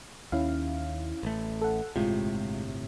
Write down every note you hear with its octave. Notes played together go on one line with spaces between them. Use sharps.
D#2 C#4 E4 F5
A1 A3
A4 F#5
G1 A2 C3 G#3 F4